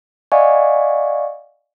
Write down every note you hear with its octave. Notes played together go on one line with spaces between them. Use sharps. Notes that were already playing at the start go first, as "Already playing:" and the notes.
D5 D#5 F5 F#5 G#5 C#6